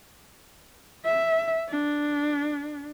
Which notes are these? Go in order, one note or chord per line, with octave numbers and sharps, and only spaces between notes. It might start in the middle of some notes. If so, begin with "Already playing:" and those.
E5
D4